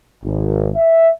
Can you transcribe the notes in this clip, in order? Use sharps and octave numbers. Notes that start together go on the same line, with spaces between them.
G#1
E5